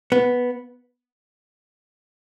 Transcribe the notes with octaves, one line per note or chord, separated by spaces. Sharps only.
B3